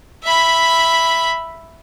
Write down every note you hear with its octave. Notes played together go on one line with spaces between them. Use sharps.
E5 B5